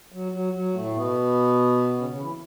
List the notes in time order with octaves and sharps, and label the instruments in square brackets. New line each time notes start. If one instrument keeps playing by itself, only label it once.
[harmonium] F#3
F#3
F#3
A2 A3
B2 B3
C#3 C#4
C#3 C#4
E3 E4